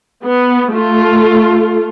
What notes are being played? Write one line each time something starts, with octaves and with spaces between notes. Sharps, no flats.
B3
A3 F4 A4